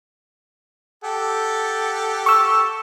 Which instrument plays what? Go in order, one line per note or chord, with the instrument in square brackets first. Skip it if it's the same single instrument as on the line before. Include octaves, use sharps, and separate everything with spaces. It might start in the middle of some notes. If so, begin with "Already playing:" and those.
[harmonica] G4 A4 F#5
[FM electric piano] C#6 E6